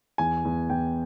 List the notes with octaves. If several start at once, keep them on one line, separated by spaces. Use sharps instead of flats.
E2 G#5
E2
E2 G5